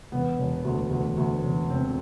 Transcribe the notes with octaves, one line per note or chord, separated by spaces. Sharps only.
E1 B3
E1
D2
D2
D2
E1
E1 C4